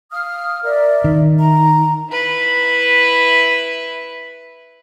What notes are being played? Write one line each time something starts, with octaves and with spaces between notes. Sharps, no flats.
F5 D#6 F6
A#4 D5 E5
D#3
A#5
E4 B4